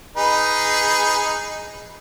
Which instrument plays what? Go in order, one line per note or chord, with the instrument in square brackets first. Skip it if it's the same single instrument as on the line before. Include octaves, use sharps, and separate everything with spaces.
[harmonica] D#4 G#4 B4